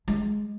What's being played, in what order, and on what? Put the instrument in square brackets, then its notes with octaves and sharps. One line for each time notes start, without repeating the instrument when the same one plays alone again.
[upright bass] G#3